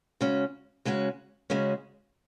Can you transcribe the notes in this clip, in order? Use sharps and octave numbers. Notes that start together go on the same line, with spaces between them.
C#3 G#3 C#4 F#4
C#3 G#3 C#4 F#4
C#3 G#3 C#4 F#4